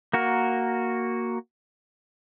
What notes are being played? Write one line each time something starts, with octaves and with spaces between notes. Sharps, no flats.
A#3 F#4 A#4